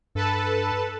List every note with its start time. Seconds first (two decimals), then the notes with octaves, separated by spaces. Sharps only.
0.15 G2 A4 B4 A5